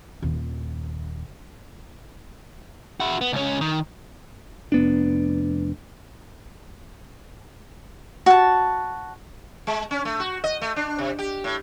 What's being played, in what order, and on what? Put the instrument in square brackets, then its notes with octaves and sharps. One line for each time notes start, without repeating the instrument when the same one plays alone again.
[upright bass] D#1 D#2
[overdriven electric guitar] E4 F#4
B3
C#2 C#4
D#3
[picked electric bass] F1 B3 D4
[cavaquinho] F#4 A5
[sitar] G#3
C#4
A3
F#4
D#5
A3
D4
C3
G4
A2